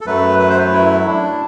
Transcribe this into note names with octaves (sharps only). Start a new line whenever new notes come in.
A4
F#2 F#3 A3 B4
B4
C5
B4
E4
D4